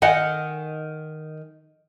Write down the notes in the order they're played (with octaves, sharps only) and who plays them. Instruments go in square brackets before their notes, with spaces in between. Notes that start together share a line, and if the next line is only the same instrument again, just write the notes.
[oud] D#3 [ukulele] D#5 F#5 G#5